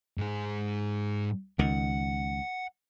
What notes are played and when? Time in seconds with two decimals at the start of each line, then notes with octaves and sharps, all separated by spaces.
0.18 G#2 G#4
1.59 C#2 D#3 F#5